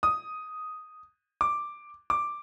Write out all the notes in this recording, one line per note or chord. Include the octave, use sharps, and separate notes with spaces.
D#6
D6
D6